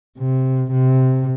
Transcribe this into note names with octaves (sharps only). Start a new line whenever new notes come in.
C3
C3